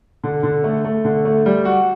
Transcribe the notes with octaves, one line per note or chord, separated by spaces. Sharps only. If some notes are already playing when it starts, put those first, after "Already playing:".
D3
D3
A3
A3
D3
A3
G3
F#4